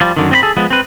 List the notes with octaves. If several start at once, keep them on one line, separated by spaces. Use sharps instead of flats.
F3 G3
F#2 D3 D#3
C4 D#5 B5
G#4 A4
F3 G#3 B3
C4 B4